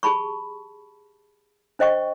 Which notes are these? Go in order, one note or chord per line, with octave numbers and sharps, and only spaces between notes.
G4 G#4 A5 B5 C#6
D4 C5 D#5 G5 C#6